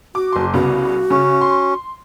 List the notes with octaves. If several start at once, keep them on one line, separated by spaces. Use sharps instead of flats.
F#4 D6
F#1 C6
C2 C#3 B3 F#4
C#3 C#4
C6